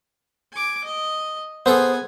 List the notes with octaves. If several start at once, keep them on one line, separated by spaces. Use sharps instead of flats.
G#5 D6
D#5
B3 G#4 A4 C5 G#5